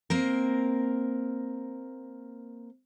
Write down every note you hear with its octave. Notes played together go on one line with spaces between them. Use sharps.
A#3 C4 A#4